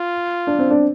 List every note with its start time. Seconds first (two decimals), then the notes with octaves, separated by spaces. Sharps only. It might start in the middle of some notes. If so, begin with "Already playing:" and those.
Already playing: F4
0.47 D4
0.59 C4
0.71 D4